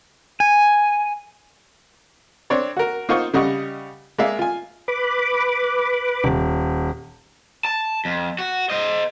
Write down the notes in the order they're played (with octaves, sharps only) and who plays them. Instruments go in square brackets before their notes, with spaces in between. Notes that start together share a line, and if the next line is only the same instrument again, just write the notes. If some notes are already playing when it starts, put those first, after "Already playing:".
[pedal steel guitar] G#5
[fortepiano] C4 D4 C#5 D5
F#4 A#4
A#3 D#4 F4 C5 F#5 C#6
C#3 G3 D#5 F#5 C#6
G#3 A#3 D5 E5 F5
F4 G#5
[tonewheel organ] B4 B5 D6
[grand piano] D#1
[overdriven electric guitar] A5
F2
F#4
C5 D#5